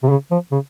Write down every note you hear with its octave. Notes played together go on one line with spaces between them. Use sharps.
C3
C#3
F3
C#3